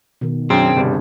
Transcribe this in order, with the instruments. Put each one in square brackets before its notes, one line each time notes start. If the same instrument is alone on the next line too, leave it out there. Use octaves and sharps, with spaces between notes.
[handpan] B2 D#3
[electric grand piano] F#2 [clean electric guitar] C4 [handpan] D4 G#4
[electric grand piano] G1 G3 [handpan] C3